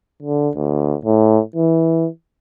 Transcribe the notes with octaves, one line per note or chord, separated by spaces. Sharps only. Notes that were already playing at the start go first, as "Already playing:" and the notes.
D3
D2
A2
E3